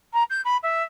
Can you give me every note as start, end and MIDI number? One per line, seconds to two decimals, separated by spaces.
0.13 0.23 82
0.29 0.41 91
0.44 0.57 83
0.62 0.82 76